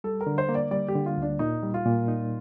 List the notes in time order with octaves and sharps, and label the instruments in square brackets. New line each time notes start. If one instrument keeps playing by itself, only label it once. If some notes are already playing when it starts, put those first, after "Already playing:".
[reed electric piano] G3 [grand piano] A4
[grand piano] A#4
[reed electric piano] D3
[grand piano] C5
[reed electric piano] A#3
[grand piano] D5
[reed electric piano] G3 [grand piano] D5
[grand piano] G4
[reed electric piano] D3
[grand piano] F4
[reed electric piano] D2 [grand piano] D4
[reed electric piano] A#2 [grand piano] D#4
[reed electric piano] G3
[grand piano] F4
[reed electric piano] A#2
D#4